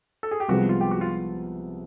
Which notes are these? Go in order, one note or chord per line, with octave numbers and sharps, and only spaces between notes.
A4
G#4
G4
C2 C3 F3 G#3 B3 F#4
F4
G4
F#4
F4